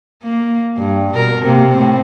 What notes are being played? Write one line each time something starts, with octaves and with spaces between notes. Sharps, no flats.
A#3
G2
B2 A#4
C3 A#3
A2 C4